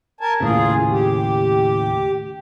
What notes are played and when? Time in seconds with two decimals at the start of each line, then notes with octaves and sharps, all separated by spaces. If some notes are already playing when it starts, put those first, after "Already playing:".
0.21 A#4 G#5 A5
0.40 D#2 A2 C#3 F4 G#4
0.90 G4